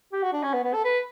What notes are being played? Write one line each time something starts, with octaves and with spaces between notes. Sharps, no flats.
G4
F#4
D4
C#4
B3
B3
A4
B4